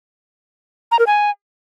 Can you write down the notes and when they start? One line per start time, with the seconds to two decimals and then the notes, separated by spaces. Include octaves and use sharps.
0.92 A#5
0.99 A#4
1.07 G#5